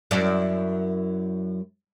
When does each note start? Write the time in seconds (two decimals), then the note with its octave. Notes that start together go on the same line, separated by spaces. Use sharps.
0.11 F#2 E4 D5